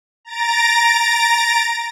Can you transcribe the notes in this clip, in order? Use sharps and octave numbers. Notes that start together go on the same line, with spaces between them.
A#5 A6 A#6 D7